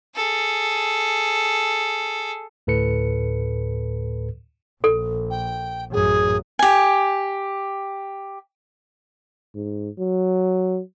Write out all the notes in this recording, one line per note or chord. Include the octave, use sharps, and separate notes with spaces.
G#4 A4
D2 A2 A4 B4 C#7
A#1 A4
G5
A1 F#2 G#4
G4 G#5
G#2
F#3